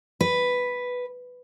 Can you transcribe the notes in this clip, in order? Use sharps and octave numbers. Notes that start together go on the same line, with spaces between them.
B4